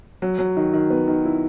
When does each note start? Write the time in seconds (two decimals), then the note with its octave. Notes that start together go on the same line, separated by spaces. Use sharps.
0.22 F#3
0.39 F#3
0.57 D#3
0.73 D#3
0.90 B3
1.08 D#3
1.25 E4